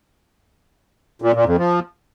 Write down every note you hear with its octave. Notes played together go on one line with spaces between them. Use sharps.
A#2
A#2
F2
F3